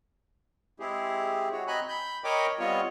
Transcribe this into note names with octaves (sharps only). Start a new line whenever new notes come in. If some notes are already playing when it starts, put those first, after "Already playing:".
G#3 C4 E4 G4 G#4
F#4 C#5
C4 D#5 G#5 A#5 B5 F#6
B5 G6
A#4 C#5 D#5 G5 B5 D6
G3 B3 C4 F4 C#5 D#5